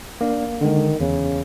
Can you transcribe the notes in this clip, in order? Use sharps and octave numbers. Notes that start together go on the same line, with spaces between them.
A#3 D4
D3 D#3 G#3
E2 C#3